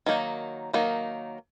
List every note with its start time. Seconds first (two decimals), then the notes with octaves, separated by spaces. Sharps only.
0.06 D#3 F#3 A#3 D#4
0.73 D#3 F#3 A#3 D#4